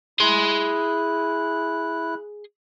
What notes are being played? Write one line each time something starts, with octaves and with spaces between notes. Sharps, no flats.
E4 G#4 C6 F#6